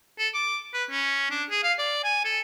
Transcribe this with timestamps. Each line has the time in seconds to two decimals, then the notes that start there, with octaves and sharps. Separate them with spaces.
0.18 A4
0.34 D6
0.74 B4
0.90 C#4
1.31 D4
1.50 G#4
1.63 F5
1.78 D5
2.04 G#5
2.24 A4